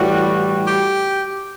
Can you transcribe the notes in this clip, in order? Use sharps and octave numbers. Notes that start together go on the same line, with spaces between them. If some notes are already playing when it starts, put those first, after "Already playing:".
Already playing: A2 E3 G3 F#4
G4